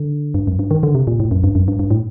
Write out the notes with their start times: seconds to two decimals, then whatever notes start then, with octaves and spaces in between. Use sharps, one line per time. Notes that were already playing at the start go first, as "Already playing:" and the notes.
Already playing: D3
0.34 G2
0.47 F#2
0.59 G2
0.71 D#3
0.83 D3
0.95 C3
1.07 A#2
1.20 A2
1.31 F#2
1.44 G2
1.55 F#2
1.68 G2
1.79 G2
1.91 A2